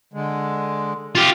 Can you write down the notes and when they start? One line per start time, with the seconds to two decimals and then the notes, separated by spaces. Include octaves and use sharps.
0.13 D3 G#3
1.15 F4 G4